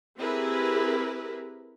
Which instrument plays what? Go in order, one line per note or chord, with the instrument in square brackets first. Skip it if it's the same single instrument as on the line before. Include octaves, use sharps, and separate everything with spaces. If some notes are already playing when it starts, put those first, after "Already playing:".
[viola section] C4 E4 G4 G#4 A#4 B4